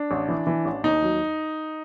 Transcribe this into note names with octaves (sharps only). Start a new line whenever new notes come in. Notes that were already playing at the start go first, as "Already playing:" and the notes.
Already playing: D4
A1
E3
E3
A1
D#2 D#4
F#3